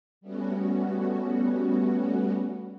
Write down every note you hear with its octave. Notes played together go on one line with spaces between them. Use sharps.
G3 A3 B3 C#4 F#4